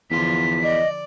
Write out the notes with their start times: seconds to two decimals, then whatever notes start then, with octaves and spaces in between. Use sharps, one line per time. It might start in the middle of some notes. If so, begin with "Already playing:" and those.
0.11 E2 D3 F3 F4 B6
0.63 D5 D#5